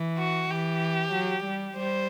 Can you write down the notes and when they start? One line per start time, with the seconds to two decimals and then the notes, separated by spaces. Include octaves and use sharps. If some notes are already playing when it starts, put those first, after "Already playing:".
Already playing: E3
0.18 F#4
0.50 E3 G4
1.13 F#3
1.44 G3
1.76 G3 C5